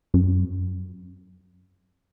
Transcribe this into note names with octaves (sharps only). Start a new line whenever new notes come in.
F#2